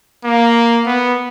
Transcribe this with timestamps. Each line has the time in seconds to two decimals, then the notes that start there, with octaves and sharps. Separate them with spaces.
0.24 A#3
0.86 B3